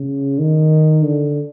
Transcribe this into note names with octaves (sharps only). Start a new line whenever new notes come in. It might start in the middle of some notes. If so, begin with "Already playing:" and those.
Already playing: C#3
D#3
D3